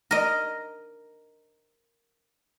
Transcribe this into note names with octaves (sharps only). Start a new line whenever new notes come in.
A#4 D#5